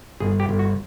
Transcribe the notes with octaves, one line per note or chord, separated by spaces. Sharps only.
G1 G#4
G4
G1
F#4